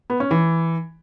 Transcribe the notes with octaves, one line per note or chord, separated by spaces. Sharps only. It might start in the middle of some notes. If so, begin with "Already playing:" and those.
B3
C#4
E3